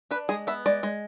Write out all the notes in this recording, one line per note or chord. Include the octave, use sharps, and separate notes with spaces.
D4 B4
G#3 G#4
B3 E5
G#3 D5
G#3